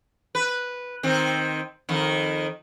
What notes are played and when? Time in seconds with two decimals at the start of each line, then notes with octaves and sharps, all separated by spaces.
0.35 B4
1.03 D#3 C4
1.89 F2 D#3